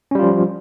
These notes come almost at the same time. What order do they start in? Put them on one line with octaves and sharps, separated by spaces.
C#4 G3 F4 F3